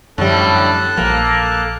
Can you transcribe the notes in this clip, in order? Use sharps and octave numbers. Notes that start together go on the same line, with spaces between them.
F#2 A2 D3 F3 G3 A4 A5 F#6
A#1 F3 A#3